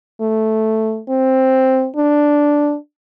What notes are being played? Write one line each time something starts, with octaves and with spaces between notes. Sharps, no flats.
A3
C4
D4